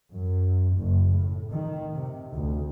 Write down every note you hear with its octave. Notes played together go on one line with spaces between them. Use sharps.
F#2
F#1
A2
D#3
C3
D2